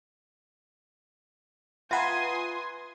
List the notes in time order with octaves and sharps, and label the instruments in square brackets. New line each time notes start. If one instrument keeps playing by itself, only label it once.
[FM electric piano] F4 B4 [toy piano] E5 F#5 A#5 [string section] G#5 C6 D#6